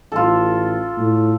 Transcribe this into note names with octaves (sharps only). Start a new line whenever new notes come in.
A1 F4 A4
A2